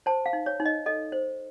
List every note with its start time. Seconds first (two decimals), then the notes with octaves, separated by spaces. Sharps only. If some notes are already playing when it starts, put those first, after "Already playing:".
0.06 C5 A5
0.26 F5
0.33 D#4
0.46 C#5
0.60 D#4
0.66 D#5
0.86 A4 D#5
1.12 C5